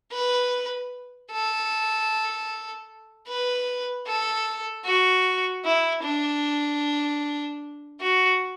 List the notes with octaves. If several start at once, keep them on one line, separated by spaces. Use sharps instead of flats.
B4
A4
B4
A4
F#4
E4
D4
F#4